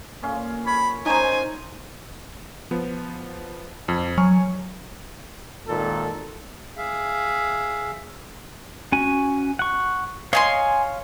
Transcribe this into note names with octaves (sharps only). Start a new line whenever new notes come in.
A#2 C#4 F5
C#5 B5
C#4 D#4 C5 G#5
F3 B3
F2
F#3 G#5 C#6 F6
G#1 A#2 D#3 A4
G#4 E5 F5
C#4 F#4 G#5
F#5 C#6
C#5 D#5 F5 G#5 C6